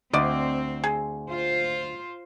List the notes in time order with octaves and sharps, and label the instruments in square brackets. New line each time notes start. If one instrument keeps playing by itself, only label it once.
[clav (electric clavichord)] D2 [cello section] C4 [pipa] D5 D#5
[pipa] G#4
[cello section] F4 C5